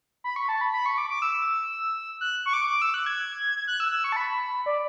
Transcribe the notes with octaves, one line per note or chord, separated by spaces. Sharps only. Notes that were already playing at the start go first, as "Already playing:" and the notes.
B5
C#6
A5
B5
B5
C#6
D6
D6
E6
F#6
C#6
D6
D6
E6
F#6
G#6
F#6
E6
E6
C#6
A5
B5
D5